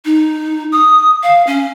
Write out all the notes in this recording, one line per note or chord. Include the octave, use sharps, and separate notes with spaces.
D#4
D#6
F5
C#4